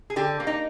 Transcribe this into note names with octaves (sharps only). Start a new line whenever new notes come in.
G#4
D3 G4
A#3
D#4